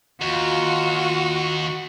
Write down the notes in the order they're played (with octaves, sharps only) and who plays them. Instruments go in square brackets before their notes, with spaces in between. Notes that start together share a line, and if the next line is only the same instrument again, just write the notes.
[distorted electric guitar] D#2 [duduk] F4 [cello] F#4